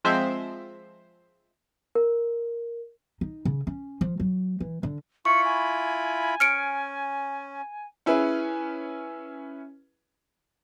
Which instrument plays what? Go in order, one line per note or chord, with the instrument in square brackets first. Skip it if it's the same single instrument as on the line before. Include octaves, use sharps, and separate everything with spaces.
[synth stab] F3 G#3 C4 C5 E5
[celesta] A#4
[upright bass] D#4
C#3
C#4
F3
F#3
E3
D3
[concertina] E4 F4 B5 [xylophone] C#6 [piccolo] C#7
[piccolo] G#5
[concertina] C#4 [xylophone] F6 C#7 D7
[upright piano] C#4 E4 G#4 B4